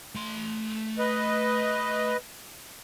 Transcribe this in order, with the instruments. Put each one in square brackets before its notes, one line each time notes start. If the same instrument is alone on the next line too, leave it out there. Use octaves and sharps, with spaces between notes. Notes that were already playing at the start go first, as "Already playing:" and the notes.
[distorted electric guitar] A3 C6
[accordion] B4 D#5